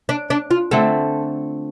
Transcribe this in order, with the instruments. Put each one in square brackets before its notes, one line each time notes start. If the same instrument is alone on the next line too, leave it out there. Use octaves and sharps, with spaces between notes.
[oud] D4
D4
F4
[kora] D3 A3 C4 [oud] A4